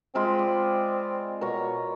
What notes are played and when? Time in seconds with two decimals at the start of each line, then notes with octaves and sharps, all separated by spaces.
0.15 G#3 C4 F4 B5
0.39 D5
1.41 B2 A#4 C#5